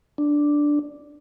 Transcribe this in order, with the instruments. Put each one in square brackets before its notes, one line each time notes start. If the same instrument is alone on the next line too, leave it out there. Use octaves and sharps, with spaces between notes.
[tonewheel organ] D4